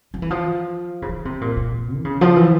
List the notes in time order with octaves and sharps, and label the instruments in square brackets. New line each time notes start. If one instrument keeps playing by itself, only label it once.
[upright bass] F3
E3
F3
C#3
E3
C3
A#2
A#2
E3
C#3
F3
E3